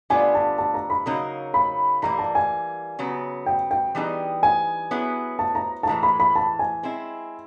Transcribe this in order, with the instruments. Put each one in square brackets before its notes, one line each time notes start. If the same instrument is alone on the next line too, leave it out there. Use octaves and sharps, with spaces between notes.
[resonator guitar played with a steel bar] D3 G3 B3 D4 F4 [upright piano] G#5
[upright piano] A5
A5
A#5
B5
[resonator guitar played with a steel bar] C#3 F#3 A#3 D#4 [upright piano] A#5
[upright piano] B5
[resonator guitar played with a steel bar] E3 G3 A#3 [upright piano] A#5
[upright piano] A5
G#5
[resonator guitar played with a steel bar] C#3 F#3 B3
[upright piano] G5
G5
[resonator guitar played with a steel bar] E3 G3 B3 D#4 G#4
[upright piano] G#5
[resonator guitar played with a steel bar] F#3 B3 E4 G#4
[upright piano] A5
A#5
A5
[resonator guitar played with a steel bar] A2 E3 G#3 [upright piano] A#5
[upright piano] B5
B5
A5
G#5
[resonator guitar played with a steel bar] G#3 C4 E4